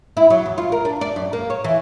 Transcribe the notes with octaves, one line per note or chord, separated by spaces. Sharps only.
E4
F#3
E2
F4
A#4
D4
D5
F#2
A#3
C#5
E3